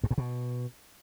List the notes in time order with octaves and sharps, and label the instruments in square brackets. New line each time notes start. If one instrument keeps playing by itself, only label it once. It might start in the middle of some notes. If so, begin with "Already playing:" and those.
[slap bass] G2
G#2
B2